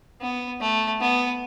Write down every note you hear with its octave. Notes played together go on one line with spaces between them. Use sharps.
B3
A3
B3